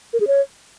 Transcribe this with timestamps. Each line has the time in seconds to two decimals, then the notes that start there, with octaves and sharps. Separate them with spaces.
0.13 A#4
0.20 G#4
0.27 C#5